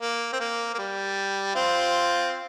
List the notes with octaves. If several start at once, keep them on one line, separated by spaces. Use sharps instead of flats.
A#3
C4
A#3
A#3
G3
C4 F4